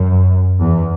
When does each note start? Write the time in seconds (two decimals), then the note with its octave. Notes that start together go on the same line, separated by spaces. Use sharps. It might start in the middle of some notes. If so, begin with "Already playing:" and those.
Already playing: F#2
0.58 E2